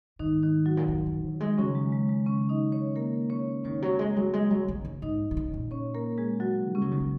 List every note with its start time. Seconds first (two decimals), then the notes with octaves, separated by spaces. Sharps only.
0.19 G#2 D#3 D#4
0.43 D#3 D#4
0.66 F#3 F#4
0.77 A#2
0.88 G#2
1.06 G#2
1.24 F#3
1.40 G#3
1.58 C#3 F#3 C#4
1.75 G#3
1.92 G#3
2.09 G#3
2.26 C#3 C#4
2.49 D#4 D#5
2.72 C#4 C#5
2.96 A#3 A#4
3.30 C#4 C#5
3.64 D#3 C#4 C#5
3.82 F#3
3.99 G#3
4.16 F#3
4.33 G#3
4.50 F#3
4.68 C#3
4.85 C#3
5.02 G#2 D#4 D#5
5.31 D#3
5.37 C#3
5.54 A#2
5.71 C#4 C#5
5.94 A#3 A#4
6.18 G#3 G#4
6.40 F#3 F#4
6.72 C#3 G#3 C#4
6.82 F#3
6.91 D#3
7.00 C#3